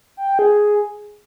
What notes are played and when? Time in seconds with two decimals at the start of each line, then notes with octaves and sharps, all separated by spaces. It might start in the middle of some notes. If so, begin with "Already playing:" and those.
0.17 G5
0.28 G5
0.39 G#4